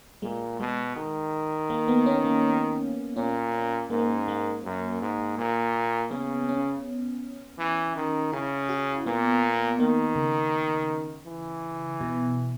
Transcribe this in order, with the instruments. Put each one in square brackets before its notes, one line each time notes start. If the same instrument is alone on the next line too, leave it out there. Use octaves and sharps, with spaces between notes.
[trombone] A#2 [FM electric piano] G#3
[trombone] B2 [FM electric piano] G#3
[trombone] D#3 [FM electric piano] G#3
[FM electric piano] A#3
B3
C#4
A#3
[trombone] A#2 [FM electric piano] C#4
[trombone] G#2 [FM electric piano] A#3
[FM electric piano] A#3
[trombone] F#2
G#2
A#2
[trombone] C#3 [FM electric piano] B3
[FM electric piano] C#4
[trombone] E3
D#3
[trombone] C#3 [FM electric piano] E4
[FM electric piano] F#4
[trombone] A#2 [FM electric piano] B3
[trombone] D#3 [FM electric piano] A#3
[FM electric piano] C#3
[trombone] E3
[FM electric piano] B2